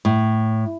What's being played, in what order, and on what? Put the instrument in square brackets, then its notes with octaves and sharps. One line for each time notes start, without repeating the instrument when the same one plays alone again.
[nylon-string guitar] A2